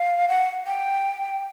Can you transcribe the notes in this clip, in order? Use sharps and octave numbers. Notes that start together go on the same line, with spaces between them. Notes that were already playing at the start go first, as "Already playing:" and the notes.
Already playing: F5
F#5
G5